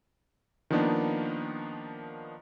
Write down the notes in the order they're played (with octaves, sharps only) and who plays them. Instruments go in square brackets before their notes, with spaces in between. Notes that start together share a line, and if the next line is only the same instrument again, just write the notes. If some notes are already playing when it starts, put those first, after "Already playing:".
[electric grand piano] D#3 F3 A#3 B3 D4 D#4